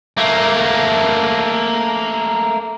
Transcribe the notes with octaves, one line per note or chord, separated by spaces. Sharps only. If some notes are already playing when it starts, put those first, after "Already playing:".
A3 A#3